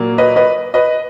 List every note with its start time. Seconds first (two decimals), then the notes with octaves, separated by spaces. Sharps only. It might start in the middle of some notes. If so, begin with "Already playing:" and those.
Already playing: A#2 F#3 A#3
0.18 B4 D#5
0.36 B4 D#5
0.74 B4 D#5